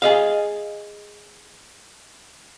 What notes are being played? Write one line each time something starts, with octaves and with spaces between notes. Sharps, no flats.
G#4 D#5 F5